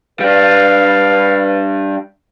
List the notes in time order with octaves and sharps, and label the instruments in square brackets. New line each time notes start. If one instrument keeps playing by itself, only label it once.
[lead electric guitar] G3 D4 [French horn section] B4 [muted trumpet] F5